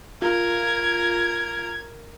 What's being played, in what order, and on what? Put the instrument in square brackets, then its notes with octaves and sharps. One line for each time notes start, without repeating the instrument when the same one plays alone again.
[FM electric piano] F4 [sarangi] A#4 [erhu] G#6